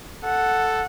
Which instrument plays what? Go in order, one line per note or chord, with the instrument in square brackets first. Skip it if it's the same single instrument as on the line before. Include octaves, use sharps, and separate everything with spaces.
[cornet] A4 [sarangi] F#5